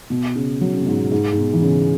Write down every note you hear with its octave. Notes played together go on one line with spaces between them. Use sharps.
B2
C#3
F#3
C#3
B2
G#2
B2
G#2
G#2
B2
E3
C#3